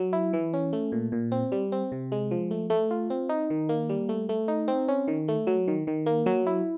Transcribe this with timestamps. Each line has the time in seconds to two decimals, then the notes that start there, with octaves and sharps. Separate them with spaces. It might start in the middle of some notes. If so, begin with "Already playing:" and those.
Already playing: F#3
0.13 E4
0.33 E3
0.53 C#4
0.73 A3
0.92 A#2
1.12 A#2
1.32 C4
1.52 G3
1.72 C4
1.92 C3
2.12 G#3
2.31 F3
2.51 A3
2.70 A3
2.91 F4
3.10 C4
3.29 D#4
3.50 D#3
3.69 A#3
3.89 G3
4.09 A3
4.29 A3
4.48 D#4
4.68 C4
4.88 C#4
5.08 D#3
5.28 A3
5.47 F#3
5.68 D#3
5.87 D#3
6.06 A#3
6.26 F#3
6.46 E4